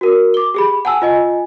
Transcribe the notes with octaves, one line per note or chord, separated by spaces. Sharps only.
F#4 A#4
D6 G7
G4 G#4 B5
F#5 G#5 A5 E6
F4 D#5 G#5